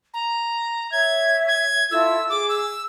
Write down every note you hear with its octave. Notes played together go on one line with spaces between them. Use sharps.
A#5
C#5 E5 G#6
G#6
E4 F4 A4 E6
G#4 D6
E6